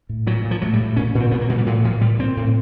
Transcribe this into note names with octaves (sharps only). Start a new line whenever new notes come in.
A2
A#2 F#3
A#2
F3
A2 F#3
G3
A2
A#2 C#4
A#2
C4
A#2 B3
A#3
A#2 G#3
G3
A2 F#3
A2 F3
A#2 G3
A#2 C4
A2